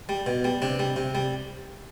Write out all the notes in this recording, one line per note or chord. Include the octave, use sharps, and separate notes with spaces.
G3
B2
G3
C3 D4
G3
C3
G3